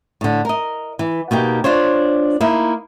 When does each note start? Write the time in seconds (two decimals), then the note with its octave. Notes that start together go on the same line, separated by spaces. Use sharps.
0.21 A2 D3
0.45 A#4 D#5
0.99 E3
1.31 B2 A#3 D#4 G4
1.64 D4 F4 C5 C#5
2.41 A#3 D#4 E4